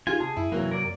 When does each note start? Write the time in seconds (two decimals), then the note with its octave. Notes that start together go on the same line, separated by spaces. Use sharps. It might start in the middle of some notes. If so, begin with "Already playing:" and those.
0.07 D#4 F4 G4 G#4 G#5
0.20 C3 G#4 A5
0.37 F#2 E4
0.52 C3 E3 F#3 A#3
0.71 A#4 D5